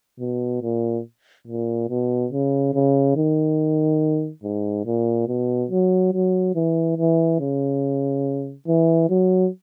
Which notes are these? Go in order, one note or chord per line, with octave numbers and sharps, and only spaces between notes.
B2
A#2
A#2
B2
C#3
C#3
D#3
G#2
A#2
B2
F#3
F#3
E3
E3
C#3
E3
F#3